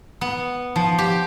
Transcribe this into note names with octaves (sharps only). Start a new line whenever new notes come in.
B3
F3
G4